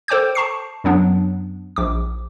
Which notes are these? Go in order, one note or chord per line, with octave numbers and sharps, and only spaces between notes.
A4 C5 G5 D6 G6
A5 C#6 C7
F#2 F#3 B3 D4
A#1 D6